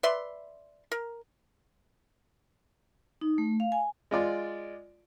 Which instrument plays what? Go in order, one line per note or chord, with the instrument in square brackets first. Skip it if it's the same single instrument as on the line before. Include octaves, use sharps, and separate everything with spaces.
[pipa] B4 D5 E5 C6
A#4
[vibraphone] D#4
A3
F5
G#5
[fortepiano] G#3 F4 D5